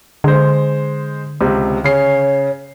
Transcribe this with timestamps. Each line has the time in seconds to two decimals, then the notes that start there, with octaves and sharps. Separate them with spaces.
0.24 D3 G#3 C5
1.41 C#2 C3
1.84 C#3 C#5 C7